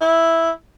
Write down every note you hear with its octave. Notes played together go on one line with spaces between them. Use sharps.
E4